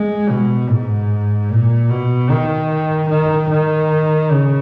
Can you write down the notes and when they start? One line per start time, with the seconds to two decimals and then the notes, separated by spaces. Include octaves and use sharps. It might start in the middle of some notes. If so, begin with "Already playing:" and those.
Already playing: G#3
0.29 B2
0.69 G#2
1.49 A#2
1.90 B2
2.30 D#3
3.10 D#3
3.51 D#3
4.31 C#3